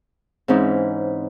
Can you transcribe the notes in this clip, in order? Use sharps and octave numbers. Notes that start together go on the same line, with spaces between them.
G#2 E3 C4 C#4 D#4